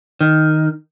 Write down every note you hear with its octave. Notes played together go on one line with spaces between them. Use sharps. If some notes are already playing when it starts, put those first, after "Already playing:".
D#3